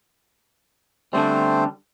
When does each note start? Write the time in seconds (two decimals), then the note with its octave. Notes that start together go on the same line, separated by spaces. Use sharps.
1.13 D3 G3 A3 C4 C5